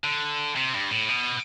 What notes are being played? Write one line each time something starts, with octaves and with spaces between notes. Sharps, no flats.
D3
C3
G2
A2
B2